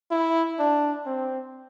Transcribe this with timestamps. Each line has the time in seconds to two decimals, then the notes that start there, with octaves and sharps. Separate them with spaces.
0.11 E4
0.59 D4
1.06 C4